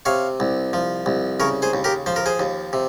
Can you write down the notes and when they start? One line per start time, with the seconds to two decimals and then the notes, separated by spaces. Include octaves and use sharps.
0.05 C3 C#5 F5
0.40 C2
0.73 F3
1.06 C2
1.40 C#3 A#4 C#5
1.62 G#4 C5
1.74 D#2
1.84 G4 A#4
2.06 F3 C5
2.16 A#4
2.26 G#4 C5
2.40 D#2
2.73 C3